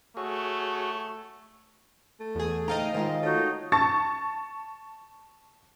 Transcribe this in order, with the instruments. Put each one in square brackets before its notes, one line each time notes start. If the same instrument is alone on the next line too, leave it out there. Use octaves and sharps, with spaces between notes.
[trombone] A3 [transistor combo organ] F#4 G#4 C#5
[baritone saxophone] A3
[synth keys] E2 G#4
[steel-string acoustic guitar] D2 D#4 A#5 [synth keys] D#5 F5 G5
[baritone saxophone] G#2 [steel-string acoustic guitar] D#3 G#3 F4
[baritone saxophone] A3 [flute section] D#4 F#4 C#5
[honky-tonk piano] A5 C#6 A6